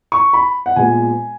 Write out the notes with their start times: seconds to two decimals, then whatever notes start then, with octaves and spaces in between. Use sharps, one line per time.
0.12 C#6
0.33 B5
0.66 F#5
0.76 A#2 G#3 B3 G#5